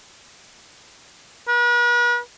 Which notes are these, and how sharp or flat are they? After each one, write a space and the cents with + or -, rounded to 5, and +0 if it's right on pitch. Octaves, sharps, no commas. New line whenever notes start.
B4 -40